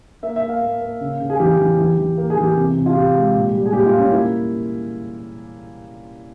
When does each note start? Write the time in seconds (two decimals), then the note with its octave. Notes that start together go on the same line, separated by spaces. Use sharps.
0.23 A#3 E5
0.36 E5
0.43 A#3
0.49 F5
0.62 A#3
0.81 A#3
1.01 C#3
1.20 C#3
1.30 G#4
1.40 E3 G4
1.59 E3
1.78 E3
1.98 E3
2.17 A#3
2.30 G#4
2.37 E3
2.43 G4
2.56 C3
2.76 C3
2.86 F4
2.95 C3 G4
3.15 G#3
3.34 A#2
3.53 G3
3.65 G#4
3.73 A#2 G4
3.86 F4
3.93 A#2
3.99 C#4
4.12 A#3 E4